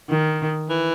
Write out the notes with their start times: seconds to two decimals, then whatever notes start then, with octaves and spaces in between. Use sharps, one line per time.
0.09 D#3
0.69 E3